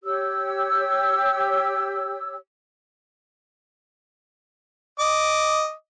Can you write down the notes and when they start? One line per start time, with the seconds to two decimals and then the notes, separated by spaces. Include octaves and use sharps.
0.04 G4 C#5 E6
5.00 D#5 D6